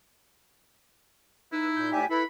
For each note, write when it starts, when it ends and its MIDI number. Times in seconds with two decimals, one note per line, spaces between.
1.52 1.98 63
1.52 1.92 64
1.52 1.67 71
1.52 1.67 88
1.76 1.91 46
1.76 1.91 91
1.92 2.05 45
1.92 2.05 67
1.92 2.06 74
1.92 2.05 76
1.92 2.06 79
1.92 2.06 80
2.10 2.23 64
2.10 2.23 69
2.10 2.24 71
2.10 2.25 83